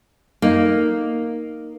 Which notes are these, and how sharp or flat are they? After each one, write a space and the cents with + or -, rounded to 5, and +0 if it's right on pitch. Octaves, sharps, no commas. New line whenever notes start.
A#3 +0 D#4 +0